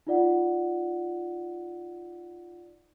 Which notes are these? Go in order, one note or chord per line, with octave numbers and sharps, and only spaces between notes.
D#4 F4 D5 F#5